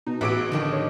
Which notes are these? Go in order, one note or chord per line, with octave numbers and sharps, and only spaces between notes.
B2 D#4
A1 F#4 G#4 B4 D6 E6 D7
F2 D3 D#3 D4
C#5